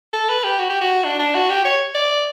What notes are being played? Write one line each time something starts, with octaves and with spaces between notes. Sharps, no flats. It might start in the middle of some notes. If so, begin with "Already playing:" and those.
A4
B4
G4
F#4
G4
F#4
D4
D4
F#4
G4
C#5
D5